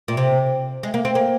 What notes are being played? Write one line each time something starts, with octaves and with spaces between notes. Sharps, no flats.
A#2
C3
G#3
A#3
C4
A#3